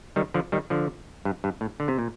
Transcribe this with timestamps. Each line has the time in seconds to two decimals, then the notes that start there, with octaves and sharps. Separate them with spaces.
0.16 D#3 G3
0.34 D3 F3
0.52 D#3 G3
0.70 D3 F3
1.25 G2
1.44 G2
1.61 A2
1.80 D3
1.88 C3
1.99 A#2